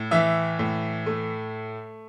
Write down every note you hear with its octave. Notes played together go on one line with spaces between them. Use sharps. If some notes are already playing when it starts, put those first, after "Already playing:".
Already playing: A2
E3 E5
A2
A3